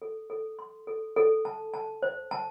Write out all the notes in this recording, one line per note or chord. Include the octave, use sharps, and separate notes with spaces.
A4
A4
C6
A4
A4
A5
A5
C5
A5